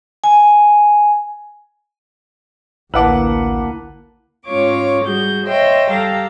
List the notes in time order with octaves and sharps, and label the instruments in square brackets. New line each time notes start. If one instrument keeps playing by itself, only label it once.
[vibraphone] G#5
[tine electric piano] A1 D6 [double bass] D2 A#3 [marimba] E4 [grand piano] B4 F#5 A5
[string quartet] G#2 C#4 F4 C#5 D6
G3 F#4 G#4 G6
C5 C#5 D#5 E5 G5 C6
G3 G4 A4 F5 A#5